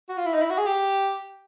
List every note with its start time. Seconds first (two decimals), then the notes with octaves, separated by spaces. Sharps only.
0.09 F#4
0.17 F4
0.26 E4
0.34 D#4
0.41 E4
0.50 F#4
0.58 G#4
0.66 G4